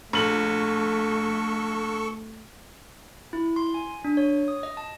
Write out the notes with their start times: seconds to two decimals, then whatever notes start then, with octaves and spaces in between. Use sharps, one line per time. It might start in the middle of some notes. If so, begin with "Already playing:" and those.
0.13 A#1 A3 A4 C#6 F#7
3.33 E4
3.56 C6
3.74 G#5
4.04 D4
4.17 C#5
4.48 D#6
4.63 D#5
4.77 A5